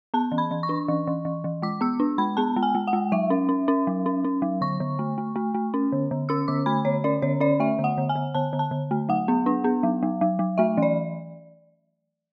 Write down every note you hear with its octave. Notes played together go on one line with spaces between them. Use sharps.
B3 A5
E3
B5
E3
C#6
D4
E3
E3
E3
E3
G#3 D6
B3 E6
D4
G#3 B5
B3 A5
G#3
G#5
G#3
F#5
G#3
F#3 E5
C#4
C#4
C#4
F#3
C#4
C#4
F#3
D3 C#6
D3
A3
A3
A3
A3
C#4
D3
D3
C#4 E6
D3 D6
A3 B5
D3 C#5
C#4 D5
D3 C#5
C#4 D5
A3 E5
D3
F#5
D3
G#5
D3
D3 A5
D3
A5
D3
A3
F#3 F#5
B3
D4
B3
F#3
F#3
F#3
F#3
A3 E5
E3
D5